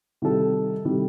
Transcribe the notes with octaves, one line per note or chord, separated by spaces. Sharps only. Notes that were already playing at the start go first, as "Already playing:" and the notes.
C3 D#3 G3 D#4 A4
C3 D#3 G3 D#4 A4